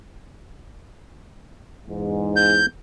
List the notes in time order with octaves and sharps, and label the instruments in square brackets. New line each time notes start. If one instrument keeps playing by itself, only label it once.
[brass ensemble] E2 G#2
[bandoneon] G6